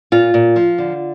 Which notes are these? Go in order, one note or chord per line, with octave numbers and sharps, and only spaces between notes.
A#2 F4
A#2
F3
D3